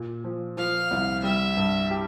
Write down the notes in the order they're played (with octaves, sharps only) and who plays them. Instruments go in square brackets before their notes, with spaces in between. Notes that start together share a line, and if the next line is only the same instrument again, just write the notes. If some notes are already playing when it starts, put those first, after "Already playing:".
Already playing: [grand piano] A#2
F3
[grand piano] F3 [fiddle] F5
[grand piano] C2
[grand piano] G3 [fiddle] E5
[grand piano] G2
G4